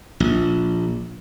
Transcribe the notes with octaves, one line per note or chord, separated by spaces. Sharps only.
A#1